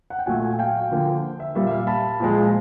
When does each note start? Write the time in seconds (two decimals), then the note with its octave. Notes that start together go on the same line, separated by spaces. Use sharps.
0.10 F#5
0.19 G5
0.26 A#2 F#3 A3 F#5 G#5
0.42 F#5 G#5
0.59 F5 G5
0.91 D3 F3 A#3
1.40 E5
1.55 A#2 G3 A#3 E5
1.67 E5
1.71 F5
1.87 A5 B5
2.20 A#2 F3 G#3